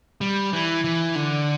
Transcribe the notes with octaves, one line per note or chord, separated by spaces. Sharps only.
G3
E3
E3
D3